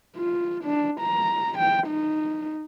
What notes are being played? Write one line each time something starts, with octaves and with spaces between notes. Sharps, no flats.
F4
D4
A#5
G5
D#4